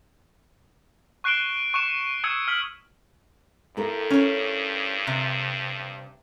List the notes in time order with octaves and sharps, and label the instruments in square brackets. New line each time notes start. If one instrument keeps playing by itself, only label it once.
[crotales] C#6 F#6 C7 D7 E7 G7
C#6 F#6 C#7 E7
D#6 E6 G#6 C#7 E7
F6 B6 F#7
[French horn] G2 [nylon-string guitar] E4 A4 A#4
[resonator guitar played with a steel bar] C#4 C#5
C3